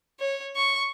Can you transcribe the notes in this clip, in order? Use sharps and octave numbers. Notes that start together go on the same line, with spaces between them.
C#5
C#6